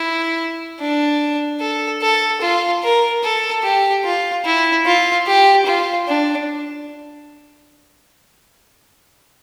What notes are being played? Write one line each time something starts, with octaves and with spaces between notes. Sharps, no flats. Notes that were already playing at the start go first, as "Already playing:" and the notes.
Already playing: E4
D4
A4
A4
F4
A#4
A4
G4
F4
E4
F4
G4
F4
D4